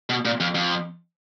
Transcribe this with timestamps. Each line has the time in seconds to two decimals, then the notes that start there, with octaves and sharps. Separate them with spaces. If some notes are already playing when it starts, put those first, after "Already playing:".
0.10 B2
0.25 A#2
0.40 F2
0.55 F2